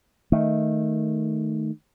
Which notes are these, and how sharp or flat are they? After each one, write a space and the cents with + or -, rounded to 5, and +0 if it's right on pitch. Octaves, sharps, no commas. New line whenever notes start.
D#3 +0 A3 +0